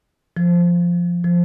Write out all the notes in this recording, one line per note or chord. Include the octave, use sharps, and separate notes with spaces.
F3
F3